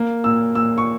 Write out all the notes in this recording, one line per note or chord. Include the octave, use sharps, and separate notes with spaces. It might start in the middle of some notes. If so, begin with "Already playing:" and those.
Already playing: A#3
A#2 E6
A#2 E6
C#6